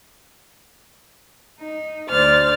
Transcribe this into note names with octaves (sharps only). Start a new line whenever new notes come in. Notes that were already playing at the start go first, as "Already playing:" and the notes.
D#4
D2 C5 D5 F6 A6